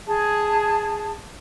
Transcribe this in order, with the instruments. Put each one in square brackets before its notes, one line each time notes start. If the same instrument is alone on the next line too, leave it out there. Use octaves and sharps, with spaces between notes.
[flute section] G#4 A5